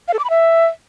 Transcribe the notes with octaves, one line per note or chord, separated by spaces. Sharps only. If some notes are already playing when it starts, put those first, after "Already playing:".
F5
A4
D6
B5
E5